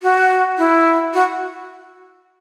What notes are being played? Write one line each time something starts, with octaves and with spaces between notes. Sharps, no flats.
F#4
E4
F#4